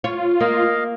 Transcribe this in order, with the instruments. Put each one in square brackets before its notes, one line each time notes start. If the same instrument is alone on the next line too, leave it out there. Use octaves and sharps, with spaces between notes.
[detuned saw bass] F4 [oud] C#5
[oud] A#3 [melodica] D#5 F5